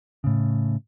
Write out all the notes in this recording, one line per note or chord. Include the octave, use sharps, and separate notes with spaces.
A2 C#3